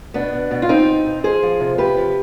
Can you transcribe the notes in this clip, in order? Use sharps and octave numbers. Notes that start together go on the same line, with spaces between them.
B2 B3 D4
B2
B2
F4
B2 C4 D#4
B2
B2
F3 G#4 C5
F3
C3
C3 G4 B4
F3